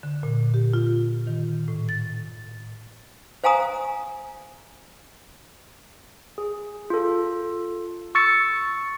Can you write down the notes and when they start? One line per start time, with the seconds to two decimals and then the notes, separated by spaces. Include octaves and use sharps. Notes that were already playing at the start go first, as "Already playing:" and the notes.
0.03 D3
0.23 A#2
0.54 G4
0.73 F4
1.27 D#3
1.68 A2
1.89 A6
3.44 C5 F5 G#5 A#5 D#6
6.38 G#4
6.90 F4 A4
8.15 C#6 E6 A6 C#7